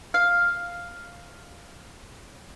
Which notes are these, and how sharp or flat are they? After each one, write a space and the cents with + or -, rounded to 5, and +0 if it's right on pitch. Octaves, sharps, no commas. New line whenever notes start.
F5 +0